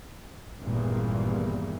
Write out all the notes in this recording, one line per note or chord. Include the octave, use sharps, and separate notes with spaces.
G#1 E2 G2 A#2